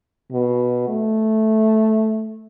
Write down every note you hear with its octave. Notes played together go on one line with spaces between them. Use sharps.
B2
A3